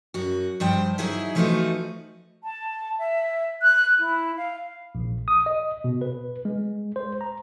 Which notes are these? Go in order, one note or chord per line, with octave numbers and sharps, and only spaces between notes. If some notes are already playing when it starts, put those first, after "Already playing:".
F#2 F#4
G2 F3 C5 G5
F#3 D#4 E4 G#4 E5
E3 F3 A3 D#4 F4 F#4
A5
E5
F#6
E4
F5
A#1
D#6
D#5
B2
B4
G#3
C5
A#5